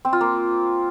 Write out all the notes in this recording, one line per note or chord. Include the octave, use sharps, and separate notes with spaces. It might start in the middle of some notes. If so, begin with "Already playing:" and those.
C4
F4
A#3